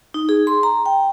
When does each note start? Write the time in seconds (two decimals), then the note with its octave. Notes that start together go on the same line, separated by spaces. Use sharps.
0.14 D#4
0.29 G#4
0.47 C6
0.63 A#5
0.86 G5